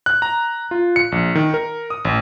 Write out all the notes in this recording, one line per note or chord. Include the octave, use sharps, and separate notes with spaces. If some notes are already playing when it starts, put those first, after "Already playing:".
F#6
A#5
F4
C#7
A#1
D#3
A#4
D#6
A1